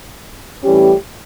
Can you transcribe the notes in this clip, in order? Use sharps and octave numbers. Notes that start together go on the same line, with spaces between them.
A2 E3 G3 C#4 G4